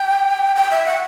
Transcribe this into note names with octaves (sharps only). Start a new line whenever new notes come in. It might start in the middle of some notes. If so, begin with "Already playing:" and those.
Already playing: G5
G5
E5
F#5